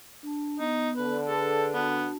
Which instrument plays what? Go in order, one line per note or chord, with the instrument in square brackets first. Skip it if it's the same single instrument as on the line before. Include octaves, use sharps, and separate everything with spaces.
[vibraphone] D4 A5
[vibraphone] B3 [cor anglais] D#4
[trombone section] D3 [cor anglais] B4
[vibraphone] G#4 B4 [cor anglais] A4
[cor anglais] B3 [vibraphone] D4 F#4 A5